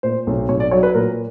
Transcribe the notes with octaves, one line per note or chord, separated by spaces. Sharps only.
A#2 C5
B1
B1 C#5
D5
F#3 C#5
B4
A#2 A#4